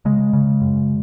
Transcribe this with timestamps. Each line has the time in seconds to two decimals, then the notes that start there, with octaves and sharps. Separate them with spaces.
0.05 C#3 G#3
0.33 C#3
0.61 F#2